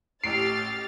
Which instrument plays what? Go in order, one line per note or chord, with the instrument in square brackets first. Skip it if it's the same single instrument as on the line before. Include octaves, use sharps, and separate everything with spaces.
[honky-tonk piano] A1 A2 D7 [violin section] G4 F6 A6 [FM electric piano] C7